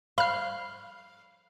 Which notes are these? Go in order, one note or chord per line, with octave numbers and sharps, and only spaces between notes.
F5 B5 F6